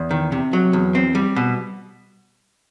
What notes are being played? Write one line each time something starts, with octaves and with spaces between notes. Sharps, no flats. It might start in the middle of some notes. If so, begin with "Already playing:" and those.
Already playing: E2
D#3
C3
F#3
E2
C4
G3
B2